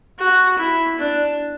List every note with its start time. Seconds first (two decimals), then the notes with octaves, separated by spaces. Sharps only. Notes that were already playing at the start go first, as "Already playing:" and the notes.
0.19 F#4
0.59 E4
0.99 D4